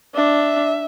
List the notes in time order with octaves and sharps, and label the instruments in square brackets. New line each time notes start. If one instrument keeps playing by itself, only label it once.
[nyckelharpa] D4 [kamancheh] E5